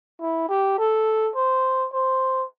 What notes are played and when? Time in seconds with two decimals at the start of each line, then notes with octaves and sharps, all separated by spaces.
0.21 E4
0.49 G4
0.79 A4
1.36 C5
1.93 C5